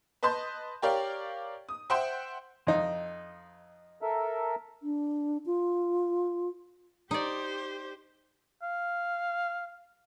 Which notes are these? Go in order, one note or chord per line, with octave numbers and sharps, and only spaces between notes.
B4 D#5 A5 C6 G6
G4 A#4 C#5 D5 F5
D#6
C5 E5 F#5 G5 C6
F2 D#4
A4 A#4 E5
D4
F4
D#4 G4 C5 D5
F5